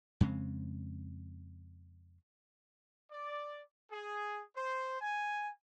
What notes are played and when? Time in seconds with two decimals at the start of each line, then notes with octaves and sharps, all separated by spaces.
0.21 F2 C#3 G#3 C4
3.11 D5
3.91 G#4
4.56 C5
5.01 G#5